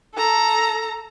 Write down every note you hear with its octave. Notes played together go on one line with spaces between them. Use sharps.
A4 A#5